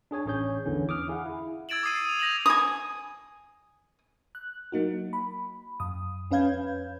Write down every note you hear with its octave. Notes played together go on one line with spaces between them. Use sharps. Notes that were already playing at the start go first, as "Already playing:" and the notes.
D4 G#4 C#5 G#5
A1 C#4 G#4 C#5 G6
E2 D3 E3 C#4
D6 D#6 F6
E4 G#4 F5 F#5
E4
E6 G#6 A6 D7 E7 F#7
D6 D#6 C7 D#7
D#6 F7
G6 A#6 D#7 E7 F#7
G#5 D#6
F#6
F#3 A#3 D#4 F#4
B5
F#2 D#6
F2 C#4 B4 F5 G6 G#6